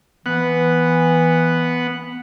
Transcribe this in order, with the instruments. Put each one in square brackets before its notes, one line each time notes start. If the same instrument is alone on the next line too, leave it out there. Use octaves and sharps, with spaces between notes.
[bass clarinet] E3 [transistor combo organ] B3 F#5